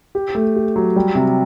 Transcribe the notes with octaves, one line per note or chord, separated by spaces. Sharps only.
G4
A3
G4
F#3
G3
C3